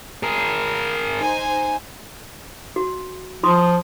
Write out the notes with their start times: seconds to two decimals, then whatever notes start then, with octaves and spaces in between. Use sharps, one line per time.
0.23 G#4 A#4
1.17 D#4 C5 G#5
2.76 F#4
3.43 F3 F4 C6 D#6